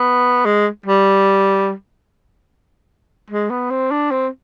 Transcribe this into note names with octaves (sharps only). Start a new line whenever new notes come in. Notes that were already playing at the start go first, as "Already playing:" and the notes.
Already playing: B3
G#3
G3
G#3
B3
C4
D4
C4